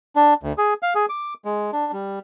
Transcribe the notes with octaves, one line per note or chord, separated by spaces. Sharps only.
D4
D2
G#4
F5
G#4
D6
G#3
D4
G3